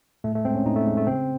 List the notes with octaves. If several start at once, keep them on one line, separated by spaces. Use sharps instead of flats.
A2 A3
A3
G#3 C4
C#4
A2 D#4
A3
G#3
A3
C#3 C4